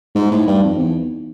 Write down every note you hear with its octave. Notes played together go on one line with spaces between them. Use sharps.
G#2 D#4
A2
G2
F2
E2